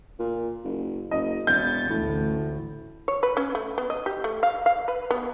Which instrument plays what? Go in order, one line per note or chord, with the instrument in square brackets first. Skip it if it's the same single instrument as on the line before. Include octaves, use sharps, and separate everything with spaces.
[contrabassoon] A#2
F#1
[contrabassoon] F#1 [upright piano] D#5
[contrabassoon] E1 [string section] B3 A6 [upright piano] G6
[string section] A1 D2 [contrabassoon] A2
[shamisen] C#5
B4
C#4
A3
B3
D#5
G4
A3
F5
F5
B4
B3